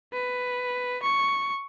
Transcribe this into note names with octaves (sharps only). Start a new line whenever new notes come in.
B4
C#6